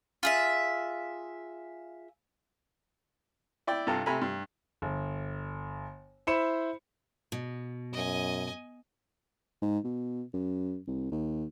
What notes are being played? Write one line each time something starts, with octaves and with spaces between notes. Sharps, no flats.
F4 G#4 E5
E4 D5 G5
G2 C3 F4 A4 A#5
C3 A3 G#5 A#5 B5
G2
G1
E4 C5 B5 C#7 E7
B2
F#2 D#5 G#5
G#2
B2
F#2
C2
D#2